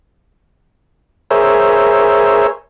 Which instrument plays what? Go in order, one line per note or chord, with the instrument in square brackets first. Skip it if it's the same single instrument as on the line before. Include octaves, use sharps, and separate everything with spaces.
[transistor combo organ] G#4 A#4 C5 C#5 E5